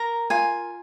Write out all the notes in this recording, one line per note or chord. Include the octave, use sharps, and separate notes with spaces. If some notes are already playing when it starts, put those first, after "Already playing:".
Already playing: A#4 A#5
F4 G#5